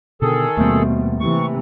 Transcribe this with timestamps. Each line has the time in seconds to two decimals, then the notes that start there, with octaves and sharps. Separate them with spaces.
0.22 B2 D3 D#3 G#4 A4
0.57 D#2 B2 G3 A3 A#3 C4
1.20 C3 E3 C#6